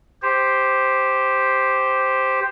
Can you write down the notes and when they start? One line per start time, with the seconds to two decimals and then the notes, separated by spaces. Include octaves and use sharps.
0.22 G4 C5